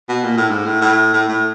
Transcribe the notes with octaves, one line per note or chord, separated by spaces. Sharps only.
B2
A#2
A2
G#2
A2
A2
A2
A2